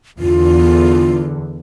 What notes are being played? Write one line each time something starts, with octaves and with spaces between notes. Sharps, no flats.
E2 D3 F4